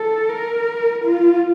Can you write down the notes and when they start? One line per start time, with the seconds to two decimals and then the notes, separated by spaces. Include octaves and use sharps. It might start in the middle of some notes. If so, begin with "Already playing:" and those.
Already playing: A4
0.29 A#4
1.05 F4